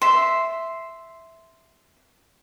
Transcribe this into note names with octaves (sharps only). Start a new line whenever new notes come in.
E5 C6